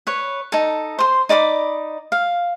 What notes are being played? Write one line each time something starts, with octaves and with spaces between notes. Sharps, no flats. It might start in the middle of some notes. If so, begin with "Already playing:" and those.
B4 C#5
D#4 A4
C5 C6
D#4 D5 B5 D6
F5